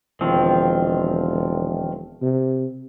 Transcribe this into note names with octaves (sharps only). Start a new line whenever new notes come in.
E1 D#3 F3 C4
C3